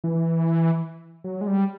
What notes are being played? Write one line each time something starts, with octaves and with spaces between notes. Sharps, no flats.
E3
F#3
G#3
G3